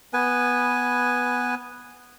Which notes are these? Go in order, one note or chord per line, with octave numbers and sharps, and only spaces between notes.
B3 B4 G#5